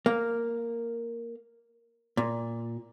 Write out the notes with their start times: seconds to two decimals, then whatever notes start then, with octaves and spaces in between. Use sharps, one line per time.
0.06 A#3
2.17 A#2